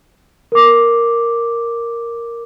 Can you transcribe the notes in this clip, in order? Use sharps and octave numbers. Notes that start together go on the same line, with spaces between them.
A#4 D6